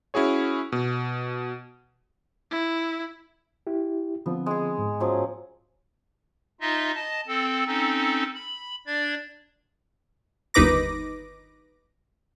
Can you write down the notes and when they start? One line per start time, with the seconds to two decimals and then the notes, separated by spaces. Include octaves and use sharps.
0.14 C#4 E4 F#4 G#4 C#5
0.72 B2
2.51 E4
3.67 E4 G4
4.26 D3 F3 B3 C4
4.46 G#3 G#4
4.78 G#2
5.00 F3 F#3 C#4
6.61 D#4 F4 D#5 E5
6.95 D#5 A5
7.27 C4 A4
7.66 C4 C#4 D#4 A4
8.35 B5
8.86 D4 D5 G#6
10.54 G1 D#2 D#4 B4 D6 A#6